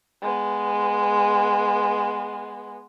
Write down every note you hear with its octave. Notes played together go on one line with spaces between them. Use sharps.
G#3 B3